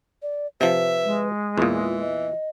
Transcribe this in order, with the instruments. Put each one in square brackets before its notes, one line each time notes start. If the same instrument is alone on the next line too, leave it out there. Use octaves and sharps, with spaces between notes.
[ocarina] D5
[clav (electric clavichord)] C3 F3 [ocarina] B4 [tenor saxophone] E5
[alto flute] G#3
[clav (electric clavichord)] E2 A#2 [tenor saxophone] E3 [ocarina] F4
[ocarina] D#5